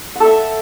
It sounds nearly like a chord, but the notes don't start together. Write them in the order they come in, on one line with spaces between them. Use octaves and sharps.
F#5 A4 E5